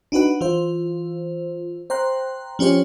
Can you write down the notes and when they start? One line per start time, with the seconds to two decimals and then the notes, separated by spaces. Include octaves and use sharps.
0.12 D4 D#4 F#4 B4 F#5
0.41 E3 F4 C5
1.90 C5 G5 A#5 C6 F#6
2.59 F3 C#4 G4 C5 C#5